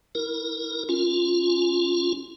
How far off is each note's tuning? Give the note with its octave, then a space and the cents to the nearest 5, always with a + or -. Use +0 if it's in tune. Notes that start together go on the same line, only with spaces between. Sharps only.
E4 -25 A#4 +0
C#4 +5 F4 +0